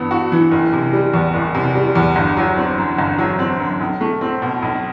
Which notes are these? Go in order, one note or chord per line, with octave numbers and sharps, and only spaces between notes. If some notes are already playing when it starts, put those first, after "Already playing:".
Already playing: G2 E3 B3
F#4
E3
F#1
C3
G3
E2
F#1
C3
G3
E2
G1
F#3
C4
F#2
G1
F#3
C4
F#2
B1
A3
C4
B2
B1